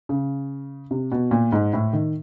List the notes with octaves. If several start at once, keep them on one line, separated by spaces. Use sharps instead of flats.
C#3
C3
B2
A#2
G#2
A2
D#3